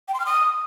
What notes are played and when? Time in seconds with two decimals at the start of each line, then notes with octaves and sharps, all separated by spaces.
0.08 G5
0.14 C6
0.20 F6
0.26 D#6